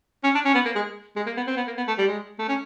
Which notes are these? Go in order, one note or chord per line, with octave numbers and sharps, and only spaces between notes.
C#4
D4
C#4
B3
A#3
G#3
G#3
A#3
B3
C4
B3
A#3
B3
A3
G3
G#3
A3
C#4